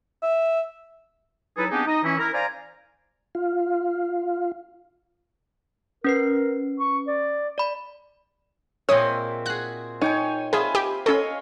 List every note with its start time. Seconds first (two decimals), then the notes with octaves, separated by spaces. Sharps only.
0.22 E5
1.57 F#3 D#4 E4 G#4 A4 B4
1.71 B3 C4 D4 D#4 G4 G#4
1.86 D#4 D#5
2.03 E3 C#4 E4
2.18 E4 A#4
2.33 C5 D5 F5 G#5 A#5
3.35 F4
6.04 C#4 A#4 B4 C7
6.80 C#6
7.07 D5
7.58 D5 B5
8.89 A#2 G#3 C4 C#5 E5 G#5 D#6
9.46 F#4 G#4 F#6
10.01 D#4 C#5 G5 G#5
10.53 C4 F4 G#4 E5 G#5 B5 C6
10.75 G4
11.06 C#4 A4 C#5 D#5 F5 G#5 B5